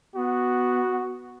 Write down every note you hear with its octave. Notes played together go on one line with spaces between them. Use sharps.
B3 F#4